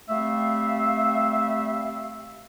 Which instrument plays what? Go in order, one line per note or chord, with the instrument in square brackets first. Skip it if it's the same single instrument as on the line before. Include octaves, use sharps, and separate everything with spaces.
[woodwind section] G3 A3 C4 E5 F5